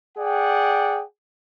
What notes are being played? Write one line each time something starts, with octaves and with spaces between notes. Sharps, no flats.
G#4 D5 F#5 G5